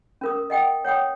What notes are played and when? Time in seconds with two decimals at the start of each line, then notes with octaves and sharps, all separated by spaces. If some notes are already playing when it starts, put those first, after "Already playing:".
0.21 C#4 A#4 D#6
0.50 D#5 F#5 G5 D#6
0.85 C#5 F#5 G5 D#6